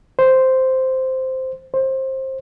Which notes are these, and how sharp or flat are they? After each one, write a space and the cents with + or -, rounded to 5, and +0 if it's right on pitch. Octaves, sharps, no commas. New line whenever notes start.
C5 -5
C5 +20